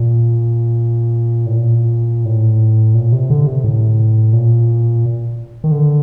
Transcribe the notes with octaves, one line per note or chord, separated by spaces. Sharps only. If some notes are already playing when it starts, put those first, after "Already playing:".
Already playing: A#2
A2
A#2
A2
A#2
C3
D3
C3
A2
A#2
D#3
D3